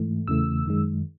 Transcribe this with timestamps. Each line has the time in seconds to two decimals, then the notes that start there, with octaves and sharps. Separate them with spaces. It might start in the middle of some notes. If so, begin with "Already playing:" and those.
Already playing: G#2 E3 A3
0.28 E2 C#3 E3 A3 E6
0.66 F#2 D#3 G#3